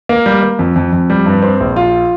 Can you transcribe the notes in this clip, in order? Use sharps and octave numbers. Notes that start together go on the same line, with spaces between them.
A#3
G3
A#3
F2
F2
F2
G3
G2
C4
A#1
F4